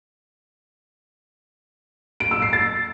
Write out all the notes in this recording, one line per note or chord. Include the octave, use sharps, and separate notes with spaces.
D7
E6
C7
A6